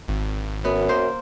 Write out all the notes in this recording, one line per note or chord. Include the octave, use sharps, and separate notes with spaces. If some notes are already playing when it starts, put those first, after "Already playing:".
G#1
F#2 B3
A#3 C5